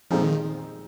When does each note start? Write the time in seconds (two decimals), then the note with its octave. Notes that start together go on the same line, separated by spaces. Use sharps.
0.11 A#2 F3 G#3 C4 D#4
0.23 D#3